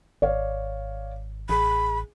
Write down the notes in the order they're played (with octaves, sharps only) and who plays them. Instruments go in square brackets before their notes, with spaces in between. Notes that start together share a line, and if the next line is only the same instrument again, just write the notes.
[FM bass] G#1 [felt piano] C#5 D5 F5
[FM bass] A1 [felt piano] G#4 [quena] B5